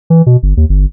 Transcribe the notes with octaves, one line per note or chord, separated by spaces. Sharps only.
E3
B2
G1
D#2
G1